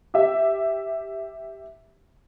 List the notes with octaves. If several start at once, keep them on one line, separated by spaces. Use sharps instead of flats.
G4 E5